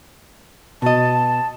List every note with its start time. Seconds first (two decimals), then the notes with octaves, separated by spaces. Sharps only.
0.82 B2 D#5 A5